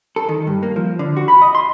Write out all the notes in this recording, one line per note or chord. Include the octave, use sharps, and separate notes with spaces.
A4
D#3
G2
A#3
F3
D3
F#4
B5
D#5
C6